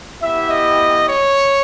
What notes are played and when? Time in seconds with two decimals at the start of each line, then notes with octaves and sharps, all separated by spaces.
0.21 B3 E4 G4 E5
0.50 D#5
1.08 C#5